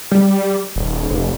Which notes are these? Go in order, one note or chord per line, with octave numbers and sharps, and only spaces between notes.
G3
D#1
F1